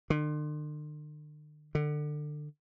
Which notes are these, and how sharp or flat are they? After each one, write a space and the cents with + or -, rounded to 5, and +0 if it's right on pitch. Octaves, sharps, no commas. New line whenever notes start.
D3 +45
D3 +25